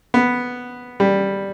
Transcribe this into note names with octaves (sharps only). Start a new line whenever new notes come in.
B3
G3